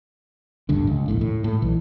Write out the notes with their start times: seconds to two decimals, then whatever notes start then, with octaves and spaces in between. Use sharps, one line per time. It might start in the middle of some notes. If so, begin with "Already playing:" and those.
0.69 A1 D2 G2 D3
0.87 C#2
1.08 E1 A#1 A2
1.21 A2
1.44 A2 A3
1.62 B1 E3